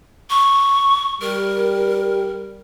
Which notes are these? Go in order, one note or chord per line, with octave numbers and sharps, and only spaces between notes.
C#6
G3 A#4